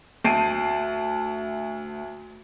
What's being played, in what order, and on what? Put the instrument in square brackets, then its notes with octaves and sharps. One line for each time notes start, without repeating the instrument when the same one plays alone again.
[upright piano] D2 A5 C7 D7 D#7